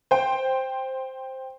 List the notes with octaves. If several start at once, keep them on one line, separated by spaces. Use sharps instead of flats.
C5 G5